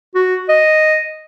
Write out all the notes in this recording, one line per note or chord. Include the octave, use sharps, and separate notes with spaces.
F#4
D#5